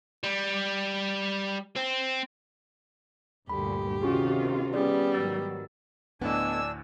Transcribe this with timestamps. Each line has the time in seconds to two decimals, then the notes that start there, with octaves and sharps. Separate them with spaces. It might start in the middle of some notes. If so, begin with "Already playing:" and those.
0.24 G3
1.76 C4
3.49 D2 G2 A#2 G4 B5
4.02 C3 D#3 C#4 F4 F#4 G#4
4.74 G3 B3 C#4 G#4 D5
5.14 G#2 D#3 F#3 E6 A6
6.22 D2 A2 B3 D4 D#5 G#5 E6